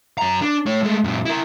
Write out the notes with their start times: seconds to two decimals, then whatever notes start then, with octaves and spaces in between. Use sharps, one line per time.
0.18 F#2 A#5
0.42 D4
0.66 A3 C#5
0.83 G#3 A3
1.04 F#2 A#2
1.26 E4 A#4